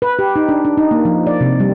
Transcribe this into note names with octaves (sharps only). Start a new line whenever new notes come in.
B4
G4
D#4
D4
D4
D#4
A#3
F3
D5
C3
G3